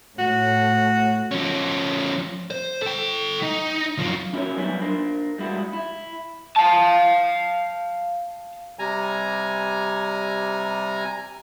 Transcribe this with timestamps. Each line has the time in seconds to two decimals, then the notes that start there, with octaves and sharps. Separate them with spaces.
0.19 A2 F#4
1.32 F3 C#4
2.51 C5
2.82 A4 G5
3.43 D#4
3.98 F#2 F3
4.33 C#4 E4 F#4 A4 A#4 C#5
4.57 F#3 G3 B3 D#4 E4
4.82 D4 A#4 C5
5.38 G3 G#3 E4 F#4
5.73 E4
6.56 F5 A5
8.79 C3 G3 G#5 A#5